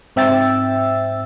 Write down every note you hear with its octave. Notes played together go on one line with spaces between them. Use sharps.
G#2 C4 E5 G5 E6 A6